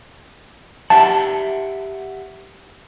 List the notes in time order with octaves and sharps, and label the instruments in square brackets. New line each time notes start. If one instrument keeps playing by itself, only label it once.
[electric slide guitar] G4 E5 F#5 [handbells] A5